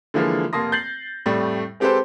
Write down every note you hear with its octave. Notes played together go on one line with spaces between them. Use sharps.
D3 E3 F3 G#3 A#3
F1 A#3 A5 C6 D#6 A#6
G6 A6 C7 F#7
F2 A2 G3 A3 D5
G#3 C4 G4 A4 B4 C5